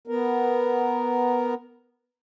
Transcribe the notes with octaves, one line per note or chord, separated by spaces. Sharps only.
B3 A#4